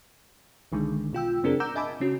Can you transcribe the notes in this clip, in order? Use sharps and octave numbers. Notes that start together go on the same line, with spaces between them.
B1 D3 D#3 G#3
B2 F4 G5 E6
F#2 C#3 C4 D4 G#4 A#4
F#5 A#5 D6 E6 G6
D#5 E5 G#5 A5 B5 D6
C#3 C#4 F#4